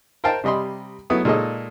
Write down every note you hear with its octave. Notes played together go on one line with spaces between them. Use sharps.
A#4 C5 F5 G5 A5
C3 G3 D#5 B5 C6
F#3 A3 B3 E4 D#6
A#2 G#3 D#4 A4 C#5 D#5